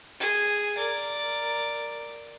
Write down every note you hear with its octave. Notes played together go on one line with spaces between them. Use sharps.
G#4 G#5
A#4 D5